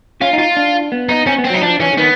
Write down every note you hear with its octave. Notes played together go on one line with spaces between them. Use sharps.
C#4 F4
D#4
F4
D4
B3
D#4
C4 C#4
B3
C4
F#3 D#4
F3 D4
E3 C#4
D3
D#3 B3